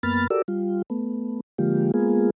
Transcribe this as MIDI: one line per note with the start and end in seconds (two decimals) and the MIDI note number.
0.03 0.27 42
0.03 0.27 58
0.03 0.27 59
0.03 0.27 83
0.03 0.27 89
0.03 0.27 93
0.30 0.42 66
0.30 0.42 67
0.30 0.42 69
0.30 0.42 70
0.30 0.42 74
0.30 0.42 88
0.48 0.82 55
0.48 0.82 65
0.90 1.40 57
0.90 1.40 59
1.58 1.92 50
1.58 1.92 53
1.58 1.92 56
1.58 1.92 58
1.58 1.92 65
1.58 1.92 67
1.94 2.30 56
1.94 2.30 58
1.94 2.30 59
1.94 2.30 65
1.94 2.30 68